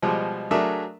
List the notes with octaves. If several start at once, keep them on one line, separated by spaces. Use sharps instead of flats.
B2 F3 G3 G#3
F#3 A3 D4 G#4 A#4 E5